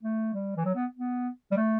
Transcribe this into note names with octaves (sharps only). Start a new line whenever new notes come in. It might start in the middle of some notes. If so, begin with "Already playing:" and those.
A3
G3
E3
F#3
B3
B3
G3
A3